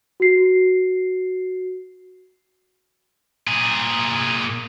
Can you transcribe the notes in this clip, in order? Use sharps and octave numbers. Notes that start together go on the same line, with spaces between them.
F#4 C7
A#2 G#4